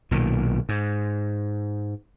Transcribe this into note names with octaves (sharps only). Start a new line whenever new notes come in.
B1 A#2 D#3
G#2